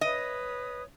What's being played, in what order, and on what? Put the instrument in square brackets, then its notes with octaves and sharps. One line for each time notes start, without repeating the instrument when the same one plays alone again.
[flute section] B4 C#5 D#6 [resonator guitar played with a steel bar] D#5